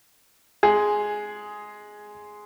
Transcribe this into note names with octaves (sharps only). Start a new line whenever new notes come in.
G#3 G#4